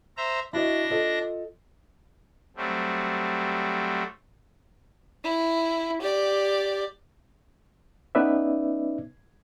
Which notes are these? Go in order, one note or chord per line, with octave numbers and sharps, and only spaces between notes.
C5 E5 A#5
D4 E4 F#4 D#5 A#6
F4 A4 D#5
F#3 G3 A3 C4
E4
G4 D5
B3 C#4 D#4 B4 D5 E5